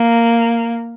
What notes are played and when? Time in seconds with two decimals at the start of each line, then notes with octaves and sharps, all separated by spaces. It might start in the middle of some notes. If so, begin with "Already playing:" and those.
Already playing: A#3